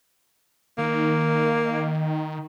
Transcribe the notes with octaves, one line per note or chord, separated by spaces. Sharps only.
D#3 A#3